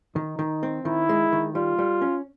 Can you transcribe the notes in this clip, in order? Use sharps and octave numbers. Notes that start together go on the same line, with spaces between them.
D#3 D#4
D#3
C4
D#3 E4
G#3
D#3
G3 F4
G3
C#4